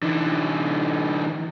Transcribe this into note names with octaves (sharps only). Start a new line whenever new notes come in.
D3 E3